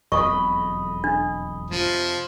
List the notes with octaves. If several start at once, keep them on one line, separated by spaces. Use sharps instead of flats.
E1 B1 F2 D#5 B5 C#6
D4
F2 C3 F3